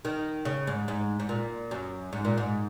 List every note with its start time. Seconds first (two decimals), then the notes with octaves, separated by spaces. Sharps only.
0.05 D#3
0.45 C#3
0.67 G#2
0.88 G#2
1.20 G#2
1.29 A#2
1.71 F#2
2.13 G#2
2.25 A#2
2.37 G#2